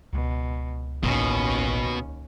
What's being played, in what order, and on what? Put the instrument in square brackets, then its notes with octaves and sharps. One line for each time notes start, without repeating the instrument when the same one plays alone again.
[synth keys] C#2 [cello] B2
[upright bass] A1 [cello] D#2 C#4 [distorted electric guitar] B2